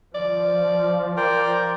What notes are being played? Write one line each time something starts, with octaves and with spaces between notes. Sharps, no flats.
F3 D5
A#4 C5 D5 G5